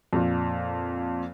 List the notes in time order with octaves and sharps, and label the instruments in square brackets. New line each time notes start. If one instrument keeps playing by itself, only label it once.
[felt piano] F2 A#2